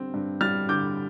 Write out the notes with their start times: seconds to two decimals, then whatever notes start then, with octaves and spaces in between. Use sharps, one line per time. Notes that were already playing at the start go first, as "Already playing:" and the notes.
Already playing: D3 G3 C4
0.14 G2
0.41 G3 F6 A6
0.69 D3 D6 G6